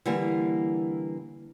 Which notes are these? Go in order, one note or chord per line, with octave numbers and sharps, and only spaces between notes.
D3 E3 G3 A#3